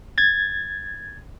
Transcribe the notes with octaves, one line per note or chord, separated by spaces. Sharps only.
G#6 A6